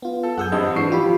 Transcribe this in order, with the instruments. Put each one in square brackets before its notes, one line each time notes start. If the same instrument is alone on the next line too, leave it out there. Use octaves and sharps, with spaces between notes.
[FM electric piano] B3 F4
[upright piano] A4
[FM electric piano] F#2 G#4 G#5 [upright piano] F#5 E6 G6
[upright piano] A1 G2 C4 [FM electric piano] D#5
[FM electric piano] G#2 E3 D4 [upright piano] C#6 C7
[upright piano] D#3 G4 [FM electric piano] F3 F4 B5